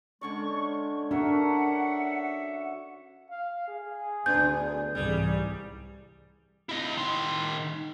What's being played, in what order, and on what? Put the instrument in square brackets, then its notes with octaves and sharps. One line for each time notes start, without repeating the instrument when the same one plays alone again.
[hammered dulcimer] D3 C#4 D5 [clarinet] G#3 [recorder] C#6
[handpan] D4 [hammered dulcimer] F#4 A#4 [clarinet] E5 [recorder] F#5
[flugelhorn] F5
G#4
[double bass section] D2 [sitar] B3 D4 [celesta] G6
[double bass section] C2 G#2 E3 [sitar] G3 G#4
[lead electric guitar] E4 D#5
D#3 C6